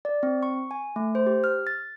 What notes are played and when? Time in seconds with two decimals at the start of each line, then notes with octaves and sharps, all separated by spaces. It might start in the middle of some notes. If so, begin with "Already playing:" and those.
0.05 D5
0.23 C4
0.43 C#6
0.71 G#5
0.96 A3
1.15 C5
1.26 G4
1.44 F6
1.67 A6